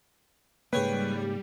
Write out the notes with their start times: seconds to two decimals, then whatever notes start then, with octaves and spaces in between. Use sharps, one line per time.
0.73 G#2 C#3 G3 A#3 G#4 B4 C#5 G5